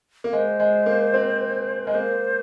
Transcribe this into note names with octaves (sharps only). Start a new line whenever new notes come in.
A#3
G#3 C5
G#3
A#3
C4
G#3 A#4
A#3 C5